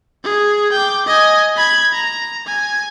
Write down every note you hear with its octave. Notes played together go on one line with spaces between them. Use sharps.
G#4
G5 D6
D#5 G#5
B5 G#6
A#5
G#5